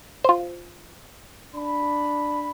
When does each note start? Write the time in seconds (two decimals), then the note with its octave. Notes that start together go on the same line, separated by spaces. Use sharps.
0.24 F4 C5
1.55 D4 B5